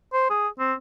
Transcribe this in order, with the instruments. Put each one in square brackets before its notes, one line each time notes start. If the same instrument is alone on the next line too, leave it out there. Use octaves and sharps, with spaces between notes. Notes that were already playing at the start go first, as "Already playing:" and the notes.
[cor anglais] C5
G#4
C4